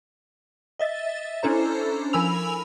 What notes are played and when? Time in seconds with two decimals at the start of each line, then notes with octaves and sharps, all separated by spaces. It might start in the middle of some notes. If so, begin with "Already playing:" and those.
0.79 D#5 E5 A6
1.43 C#4 D4 E4 A4 C5 A#5
2.13 F3 A#4 G#5 B5 E6 F7